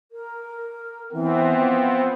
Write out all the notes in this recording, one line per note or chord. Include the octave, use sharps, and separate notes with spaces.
A#4
E3 B3 C4
F3